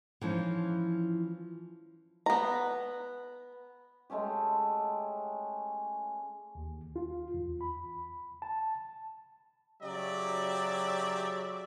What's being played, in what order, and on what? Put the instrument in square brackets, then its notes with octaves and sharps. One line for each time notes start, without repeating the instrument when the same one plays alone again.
[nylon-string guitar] E3 F3 C#4 D#4
[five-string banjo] B3 A#5
[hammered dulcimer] G#3 A3 C#4 G4
[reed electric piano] D#2
F4
E2
B5
A5
[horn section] C#3 F#3 G4 D5 E5